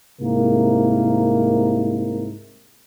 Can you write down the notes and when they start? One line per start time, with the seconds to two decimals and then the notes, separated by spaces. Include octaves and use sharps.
0.21 C2 G#2 C3 A#3 E4 A#4